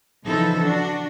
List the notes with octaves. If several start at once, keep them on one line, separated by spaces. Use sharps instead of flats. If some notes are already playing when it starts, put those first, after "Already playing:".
C#3 E3 F3 D#4 E4 A4
D4 F#4